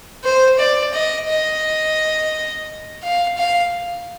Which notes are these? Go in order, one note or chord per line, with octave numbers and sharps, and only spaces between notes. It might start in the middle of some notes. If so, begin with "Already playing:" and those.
C5
D5
D#5
D#5
F5
F5